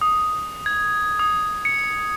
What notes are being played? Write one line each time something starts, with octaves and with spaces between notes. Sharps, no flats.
D#6
G#6
D#6
C#7